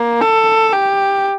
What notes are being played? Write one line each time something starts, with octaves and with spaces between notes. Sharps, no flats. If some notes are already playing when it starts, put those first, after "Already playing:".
Already playing: A#3
A4
G4